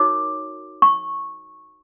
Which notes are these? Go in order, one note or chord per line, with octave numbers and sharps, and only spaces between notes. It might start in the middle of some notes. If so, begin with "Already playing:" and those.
Already playing: D#4 F#4 A#4 C#5 D6
C#6